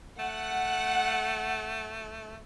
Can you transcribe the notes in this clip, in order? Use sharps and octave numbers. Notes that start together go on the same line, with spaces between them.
A3 F#5